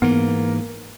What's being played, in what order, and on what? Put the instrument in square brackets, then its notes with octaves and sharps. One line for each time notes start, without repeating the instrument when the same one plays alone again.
[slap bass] G#2 E3 [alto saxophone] A#3 [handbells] B3